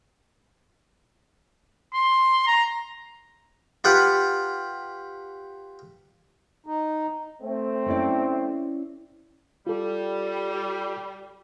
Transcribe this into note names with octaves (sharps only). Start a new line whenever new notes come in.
C6
A#5
F4 G4 B4 F#5
D#4
A3 C4
C#4 E4 D5
G3 F4 A4